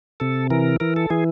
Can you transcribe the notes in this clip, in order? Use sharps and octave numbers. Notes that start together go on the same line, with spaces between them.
C3 A4
E3 A#4
E3 A#4
A4
E3 G#4